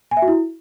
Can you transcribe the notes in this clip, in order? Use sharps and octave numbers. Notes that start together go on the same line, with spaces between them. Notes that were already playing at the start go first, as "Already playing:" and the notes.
G#5
E5
F#4
E4